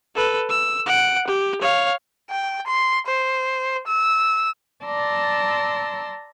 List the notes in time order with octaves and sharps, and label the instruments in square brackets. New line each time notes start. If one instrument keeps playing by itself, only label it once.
[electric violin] A4 B4
E6
F#5 D7
G4
C#5 F5
[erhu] G5
C6
C5
E6
[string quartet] D5 A5 A#5 C6 E6